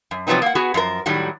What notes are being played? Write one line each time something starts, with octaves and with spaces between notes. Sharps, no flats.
F#2
C3 F3 F#3 B3 C4 D#4
A#3 F#5
B3 F#4 G#4
F#2 F3 A#4
A2 D#3 F#3 G3